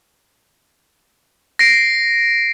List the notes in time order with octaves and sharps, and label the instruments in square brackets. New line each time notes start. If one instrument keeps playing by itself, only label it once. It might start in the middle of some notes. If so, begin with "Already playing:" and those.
[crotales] A#6 C7 D7